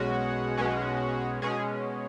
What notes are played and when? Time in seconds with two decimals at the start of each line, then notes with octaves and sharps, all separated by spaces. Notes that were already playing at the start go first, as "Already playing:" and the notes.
Already playing: B1 B2 G#3 C#4 F#4
0.58 B1 B2 G#3 C#4
1.42 B2 G#3 C#4 G#4